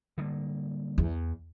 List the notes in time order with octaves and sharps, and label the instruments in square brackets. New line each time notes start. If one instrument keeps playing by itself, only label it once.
[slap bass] D3 G3 A#3
[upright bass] E2